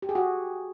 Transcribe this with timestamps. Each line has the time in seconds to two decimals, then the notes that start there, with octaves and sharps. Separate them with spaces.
0.02 G4
0.09 G#4
0.15 F#4